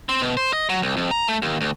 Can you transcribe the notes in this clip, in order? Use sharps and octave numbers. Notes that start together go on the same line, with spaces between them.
C4
B2
C5
D#5
F#3
C2
F2
A#5
A3
D#2
D2